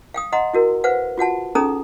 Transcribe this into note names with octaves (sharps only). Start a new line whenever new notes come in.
F5 G5 D#6
D#5 F#5 A#5 C6
E4 F#4 A#4
B4 C5 F5 F#5
F4 F#4 F#5 A5
C#4 D#4 G#4 A4 A#5 D#6